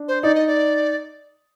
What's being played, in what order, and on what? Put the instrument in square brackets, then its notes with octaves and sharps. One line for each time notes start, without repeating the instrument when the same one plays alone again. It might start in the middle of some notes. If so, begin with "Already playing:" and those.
Already playing: [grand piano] D4
[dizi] C5
[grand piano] D#4 [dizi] D5
[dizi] D#5
D5